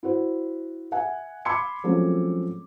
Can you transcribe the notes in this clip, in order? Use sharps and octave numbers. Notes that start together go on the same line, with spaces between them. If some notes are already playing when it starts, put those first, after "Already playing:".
E4 F#4 C5
E5 F#5 G#5
B5 C6 D6 E6 G#6 C#7
F3 F#3 G#3 A3 C4 C#4